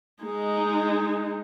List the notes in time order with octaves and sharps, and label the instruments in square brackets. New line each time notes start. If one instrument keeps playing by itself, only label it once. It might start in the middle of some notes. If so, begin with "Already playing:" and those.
[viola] G#3 D#4